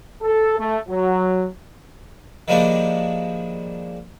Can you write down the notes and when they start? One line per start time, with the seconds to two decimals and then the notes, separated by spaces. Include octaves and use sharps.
0.22 A4
0.58 A3
0.89 F#3
2.48 D#3 F3 G3 G#3 A#3 D4